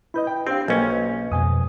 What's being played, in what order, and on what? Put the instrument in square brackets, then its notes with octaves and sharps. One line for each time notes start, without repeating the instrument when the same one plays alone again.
[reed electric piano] E4 B4 D#5 [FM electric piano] B5 G6
[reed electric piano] G5
[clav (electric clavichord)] C4 [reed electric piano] D4 C5 G5 [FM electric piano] G4 F5
[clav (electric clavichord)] B1 C#4 [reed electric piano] F#3 A#3 [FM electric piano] C5 G#5
[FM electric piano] F2 B2 G#3 [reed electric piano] G#5 D#6